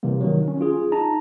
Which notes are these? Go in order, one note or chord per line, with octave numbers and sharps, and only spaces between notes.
C3 E3 G3 A#3
D#3 F#3
C#4
F4 G#4
D#4 A5 A#5